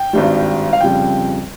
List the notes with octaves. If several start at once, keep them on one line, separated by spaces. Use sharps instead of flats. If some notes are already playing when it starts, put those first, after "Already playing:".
Already playing: G5
G#1 G2 G3
F5
F2 C#3 G3 G5